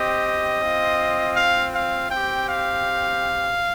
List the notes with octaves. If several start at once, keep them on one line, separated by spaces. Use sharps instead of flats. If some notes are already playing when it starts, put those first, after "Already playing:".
Already playing: C4 G4 D#5
C4 F4
F5
F5
C4 G4 G5
F5